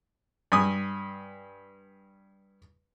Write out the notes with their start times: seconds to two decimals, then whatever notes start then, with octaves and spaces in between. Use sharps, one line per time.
0.52 G2 G#5 D#6